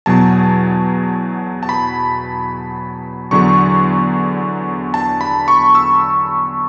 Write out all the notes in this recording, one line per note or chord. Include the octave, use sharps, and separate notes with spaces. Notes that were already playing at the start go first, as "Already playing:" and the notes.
E2 B2 F#3 A5
A5
B5
E2 D3 F#3 C#6
A5
B5
C#6
E6